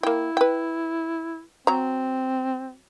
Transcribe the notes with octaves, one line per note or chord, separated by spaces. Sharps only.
A#3 E4 G5
B4 G5
F#3 C4 A#5